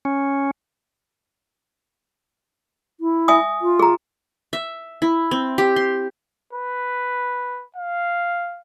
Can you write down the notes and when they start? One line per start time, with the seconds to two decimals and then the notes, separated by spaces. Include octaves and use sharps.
0.05 C#4
3.00 E4
3.28 E5 G#5 D#6
3.62 F4
3.79 G#4 A#5
4.53 E5
5.02 E4
5.31 C4
5.58 G4
5.76 C6
6.53 B4
7.76 F5